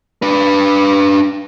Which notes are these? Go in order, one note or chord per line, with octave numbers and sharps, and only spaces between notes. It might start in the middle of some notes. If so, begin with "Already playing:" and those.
D4 B4